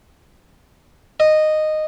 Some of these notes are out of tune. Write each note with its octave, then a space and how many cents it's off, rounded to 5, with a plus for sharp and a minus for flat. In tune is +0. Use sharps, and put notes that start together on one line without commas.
D#5 -10